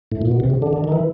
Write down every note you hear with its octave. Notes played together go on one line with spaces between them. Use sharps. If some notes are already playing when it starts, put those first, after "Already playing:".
A2
A#2
B2
C3
C#3
D3
D3
D#3
E3